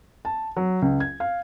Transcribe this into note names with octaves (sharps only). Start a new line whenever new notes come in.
A5
F#3
C#2
G#6
F5